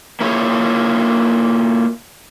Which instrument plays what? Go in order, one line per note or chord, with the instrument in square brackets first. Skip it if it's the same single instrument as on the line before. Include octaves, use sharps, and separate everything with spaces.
[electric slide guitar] A#3 E4 F4 C#5